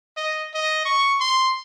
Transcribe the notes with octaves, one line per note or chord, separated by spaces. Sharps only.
D#5
D#5
C#6
C6